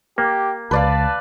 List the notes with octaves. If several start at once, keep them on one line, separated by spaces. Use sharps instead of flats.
A#3 G4
C#2 B4 D5 F5 A5